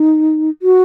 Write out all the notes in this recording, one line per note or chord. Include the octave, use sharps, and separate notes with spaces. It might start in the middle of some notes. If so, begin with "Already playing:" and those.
Already playing: D#4
F#4